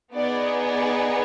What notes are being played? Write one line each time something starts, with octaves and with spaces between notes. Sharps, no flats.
B3 D#4 G#4 D5
D5